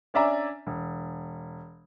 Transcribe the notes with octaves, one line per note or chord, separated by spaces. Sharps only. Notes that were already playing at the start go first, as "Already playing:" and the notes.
C#4 D4 D5 E5 G#5 A#5
E1